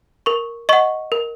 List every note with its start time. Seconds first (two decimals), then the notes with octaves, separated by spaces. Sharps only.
0.26 A#4 C#6
0.69 D#5 F#5 C#6
1.12 A#4